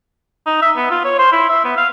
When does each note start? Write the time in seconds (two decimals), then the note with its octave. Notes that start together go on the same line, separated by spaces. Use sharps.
0.46 D#4
0.62 E5
0.76 B3
0.91 F4
1.04 C#5
1.19 C5
1.32 E4
1.49 E5
1.65 B3
1.77 F5